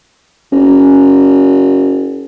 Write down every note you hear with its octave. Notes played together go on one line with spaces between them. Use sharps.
F#1 C#4